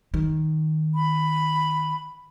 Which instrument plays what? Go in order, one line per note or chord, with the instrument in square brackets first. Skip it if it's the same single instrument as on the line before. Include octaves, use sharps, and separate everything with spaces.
[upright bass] D#3
[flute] B5